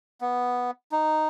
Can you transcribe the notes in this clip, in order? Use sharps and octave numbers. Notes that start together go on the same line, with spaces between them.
B3
D#4